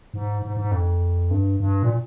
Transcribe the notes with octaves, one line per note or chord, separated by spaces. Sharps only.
G#2
G#2
G#2
F2
G2
G2
A#2